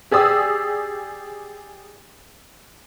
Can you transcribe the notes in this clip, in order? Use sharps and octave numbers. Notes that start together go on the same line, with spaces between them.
G4 G#4 D5 D#6 E6